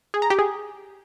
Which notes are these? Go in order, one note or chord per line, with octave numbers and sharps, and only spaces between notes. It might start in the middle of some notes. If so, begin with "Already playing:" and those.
G#4
A#5
G4
G#4